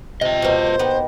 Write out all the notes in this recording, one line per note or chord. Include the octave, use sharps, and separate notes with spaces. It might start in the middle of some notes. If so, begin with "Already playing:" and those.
C3 F4 D#5
B2 A#3 C5
B3 D#4 G4